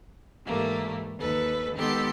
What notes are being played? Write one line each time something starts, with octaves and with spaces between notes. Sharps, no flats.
G#2 E3 G3 A3 A#3
D#2 A4 B4
D#3 G#3 B3 G4 A4 C6